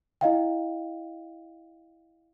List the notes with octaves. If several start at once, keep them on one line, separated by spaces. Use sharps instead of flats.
E4 D#5 F5 G5